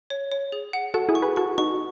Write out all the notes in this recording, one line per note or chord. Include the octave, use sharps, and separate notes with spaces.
C#5
C#5
G#4
F#5
F#4 A4 F#5
E4 G#4
C#6
G#4 B4
F#4 A4 C#6
D#4 F#4 C#6